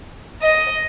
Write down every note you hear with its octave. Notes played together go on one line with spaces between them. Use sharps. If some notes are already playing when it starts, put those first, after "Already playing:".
D#5